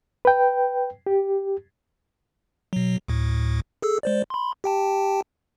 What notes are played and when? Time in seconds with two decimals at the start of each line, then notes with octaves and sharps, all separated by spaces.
0.25 B4 G5
1.07 G4
2.73 B2 F#3
3.08 D2 A2
3.82 G#4 A4 E6
4.03 G#3 C5 D5
4.30 B5 C6
4.64 G4 G5 A5